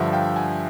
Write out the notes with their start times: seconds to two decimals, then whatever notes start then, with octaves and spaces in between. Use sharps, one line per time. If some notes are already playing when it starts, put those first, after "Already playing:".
Already playing: G2 D3 F3 E5 F#5
0.13 F5 G5
0.36 F#5 G#5